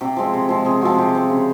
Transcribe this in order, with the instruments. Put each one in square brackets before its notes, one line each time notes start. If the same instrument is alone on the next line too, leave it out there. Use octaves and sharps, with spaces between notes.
[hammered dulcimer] C3 G4
F3 G#3 C4
C3
F3 G#3 C4
C3 G#4
F3 G#3 C4 F#4
C3 G4
F3 G#3 C4
C#3